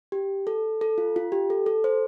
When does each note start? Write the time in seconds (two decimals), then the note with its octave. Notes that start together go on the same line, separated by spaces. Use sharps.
0.12 G4
0.47 A4
0.81 A4
0.98 F4
1.16 F4
1.32 G4
1.50 A4
1.66 A4
1.84 C5